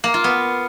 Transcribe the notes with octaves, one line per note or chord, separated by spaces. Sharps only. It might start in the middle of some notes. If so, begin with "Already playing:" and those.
A#3
F4
B3